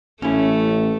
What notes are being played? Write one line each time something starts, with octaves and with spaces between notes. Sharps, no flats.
A1 A3 C#4 E4